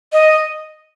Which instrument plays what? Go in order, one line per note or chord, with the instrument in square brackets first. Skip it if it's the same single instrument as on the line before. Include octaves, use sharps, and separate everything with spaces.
[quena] D#5